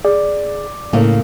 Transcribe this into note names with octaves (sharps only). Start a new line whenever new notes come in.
G#4 D5
A2 C#3 A3 A#3